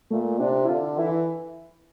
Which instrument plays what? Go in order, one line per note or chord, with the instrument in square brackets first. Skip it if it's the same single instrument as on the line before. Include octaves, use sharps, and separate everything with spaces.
[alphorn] A#2 [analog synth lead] A3
[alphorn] C3 [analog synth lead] D4
[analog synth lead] E4
[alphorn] D3 [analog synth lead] F4
[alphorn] E3 [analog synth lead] E4